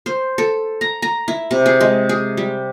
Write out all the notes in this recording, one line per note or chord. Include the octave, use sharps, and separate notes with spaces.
C5
A4
A#5
A#5
E4
C3
G#4
G#3
G#4
G3